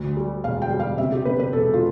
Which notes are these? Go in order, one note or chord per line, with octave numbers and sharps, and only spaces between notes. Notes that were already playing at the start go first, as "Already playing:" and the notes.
Already playing: D2
G3
E1 F5
G5
G3
F5
C3 E5
G4
C3 B4
B4
E1 A4
F4